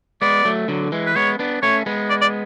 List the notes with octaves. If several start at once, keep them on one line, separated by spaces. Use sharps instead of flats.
G#3 B3 D5
F#3 A3
D3 F#3
E3 G#3
B4
G#3 B3 C#5
B3 D4
A3 C#4 C#5
G#3 B3
D5
D5